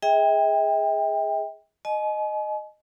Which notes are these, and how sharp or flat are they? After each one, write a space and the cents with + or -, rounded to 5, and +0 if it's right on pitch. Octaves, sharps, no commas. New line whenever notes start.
G#4 +0 E5 -45 G5 +25
D#5 -15 G#5 +40